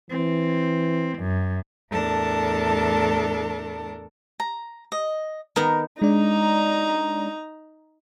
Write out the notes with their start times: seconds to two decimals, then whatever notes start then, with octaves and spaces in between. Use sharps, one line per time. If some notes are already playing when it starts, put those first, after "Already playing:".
0.10 E3 C4
1.19 F#2
1.90 E2 A2 D4 A4 A#4 A5
4.40 A#5
4.92 D#5
5.56 D#3 B3 D#4 A#4
6.02 G#3 D4 D#4 D5 A#5